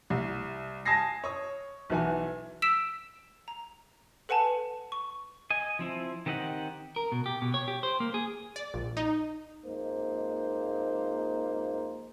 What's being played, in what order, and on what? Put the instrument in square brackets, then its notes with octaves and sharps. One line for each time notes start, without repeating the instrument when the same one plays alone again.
[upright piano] C2
G#5 A5 D#6 G#6 A#6 C7
C#5 D#6
B1 E3 G#5
[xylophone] E6 B6 D7 E7
A#5
A4 B4 F#5 G#5 A5
C#6
[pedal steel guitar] D#5 G#5
F3 C4 E4
D#3 C4 G4 D#5 F#5
[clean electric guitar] A#4
B2
G4
B2
C#5
G4
C5
A#3
G#4
[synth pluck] D5
A#1
D#4
[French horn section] F2 G#3 A#3 D#4 C5